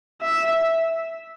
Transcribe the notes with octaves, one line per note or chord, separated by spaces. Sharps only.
E5